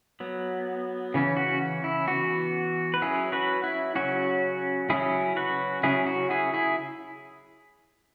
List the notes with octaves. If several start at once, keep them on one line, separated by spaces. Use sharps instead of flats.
F#3 B3
C#3 E3 C#4
F#4
E4
E3 B3 F#4
B4
F#3 C#4 E4 G#4
F#4 B4
E4
C#3 F#3 C#4 F#4
C#3 F#3 C#4 E4 G#4
F#4 B4
C#3 F#3 C#4 E4 G#4
F#4
E4 G#4
E4 G#4